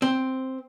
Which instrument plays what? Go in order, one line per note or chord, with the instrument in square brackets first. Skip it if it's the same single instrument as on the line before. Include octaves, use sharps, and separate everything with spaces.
[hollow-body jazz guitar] C4